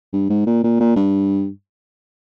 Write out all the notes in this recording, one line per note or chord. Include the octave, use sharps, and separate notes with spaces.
G2
G#2
A#2
A#2
A#2
G2